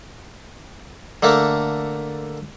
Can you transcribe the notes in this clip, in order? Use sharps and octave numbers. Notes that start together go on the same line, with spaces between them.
D3 A3 A#3